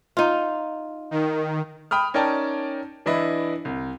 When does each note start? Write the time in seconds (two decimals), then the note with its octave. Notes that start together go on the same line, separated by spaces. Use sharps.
0.17 D#4 F4
1.11 D#3
1.91 G5 B5 D#6 F6
2.14 C#4 D#4 A#4 D5 G5 A5
3.06 E3 D4 E4 D#5 B5
3.65 C2